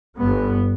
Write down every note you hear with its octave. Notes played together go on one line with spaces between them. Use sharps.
G1 G2 B3